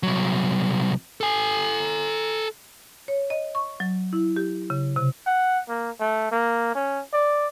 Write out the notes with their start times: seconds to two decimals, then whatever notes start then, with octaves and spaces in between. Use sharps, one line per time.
0.03 C2 F#3
1.21 A4 G#5
3.08 C#5
3.30 D#5
3.55 C#6
3.80 F#3
4.13 E4
4.36 G4
4.70 C#3
4.96 C3
5.27 F#5
5.69 A#3
6.00 A3
6.32 A#3
6.75 C#4
7.13 D5